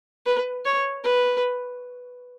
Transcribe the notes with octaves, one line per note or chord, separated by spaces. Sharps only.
B4
C#5
B4